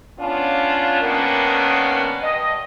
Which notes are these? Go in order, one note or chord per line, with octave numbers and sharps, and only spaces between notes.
B3 C#4 D4 F4
D#3 A#3 B3 C#4 D4
G2 D#5